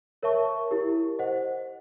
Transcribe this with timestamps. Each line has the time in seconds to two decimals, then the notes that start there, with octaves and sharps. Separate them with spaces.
0.23 A#4 C#5 E5 A5 C#6
0.71 E4 G4 A#4
1.19 C5 D#5 F#5